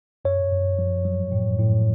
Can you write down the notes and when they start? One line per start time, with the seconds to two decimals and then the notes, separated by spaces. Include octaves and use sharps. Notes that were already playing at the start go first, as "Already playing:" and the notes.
0.25 F#2 C#5
0.51 F#2
0.79 F3
1.05 F#3
1.32 A2
1.59 A2